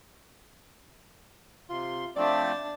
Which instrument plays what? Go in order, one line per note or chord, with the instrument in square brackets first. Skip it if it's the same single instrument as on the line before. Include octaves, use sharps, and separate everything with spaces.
[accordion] C3 C6 [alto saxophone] F4
[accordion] F3 A3 C4 [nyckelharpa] D4 A5 [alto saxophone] D5